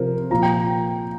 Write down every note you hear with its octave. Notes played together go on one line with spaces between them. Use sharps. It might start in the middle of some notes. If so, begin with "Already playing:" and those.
Already playing: C3 F3 A#4 C5
A#2 F3 A#5
G5